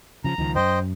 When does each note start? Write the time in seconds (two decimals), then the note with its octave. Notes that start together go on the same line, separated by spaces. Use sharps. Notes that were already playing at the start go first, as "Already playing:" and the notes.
0.24 C#3 F3 A#5
0.38 C#2 D#3 F3
0.55 F#2 C5 D#5 G5